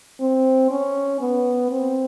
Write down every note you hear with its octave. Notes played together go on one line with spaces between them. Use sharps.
C4
C#4
B3
C4